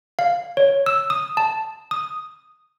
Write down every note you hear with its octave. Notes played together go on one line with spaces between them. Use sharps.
F5
C#5
E6
D#6
A5
D#6